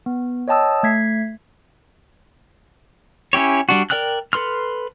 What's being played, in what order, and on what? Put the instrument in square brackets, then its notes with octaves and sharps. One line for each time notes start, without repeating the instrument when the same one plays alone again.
[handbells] B3
C#5 D#5 G5 A5 D#6 E6
A3 G#6 B6 C7
[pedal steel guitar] C#4 E4 G4 C#5
G3 D4 F#4
A#4 D5 G5 F6 F#6
A4 B4 C6 F6